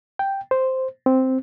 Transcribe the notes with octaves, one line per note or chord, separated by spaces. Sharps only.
G5
C5
C4